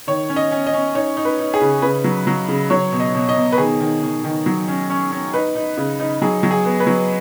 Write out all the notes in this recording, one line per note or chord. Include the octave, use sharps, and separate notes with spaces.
D#3 C#5
C#4
D#5
C#4
D#5
C#4
D#4 C#5
D#4
B4
D#4
G#4
C#3
C#3 B4
F#3
F#3
C#3
F#3 C#5
B2
D#5
B2
D#5
B2
B4
D#3 G#4
D#3
D#3
D#3
F#3
C#4
C#4
C#4
D#4 B4
D#4
C#3
D#4
F#3 G#4
F#3
G#4
B3
B4
F#3